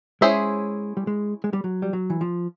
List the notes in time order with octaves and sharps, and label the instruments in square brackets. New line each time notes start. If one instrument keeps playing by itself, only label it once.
[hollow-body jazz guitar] G#3 [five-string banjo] C#4 E4 G#4 C5 E5
[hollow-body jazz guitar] G3
G#3
G#3
G3
F#3
G3
F#3
E3
F3